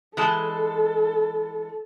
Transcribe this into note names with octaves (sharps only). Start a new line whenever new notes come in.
E3 G#3 A4 A5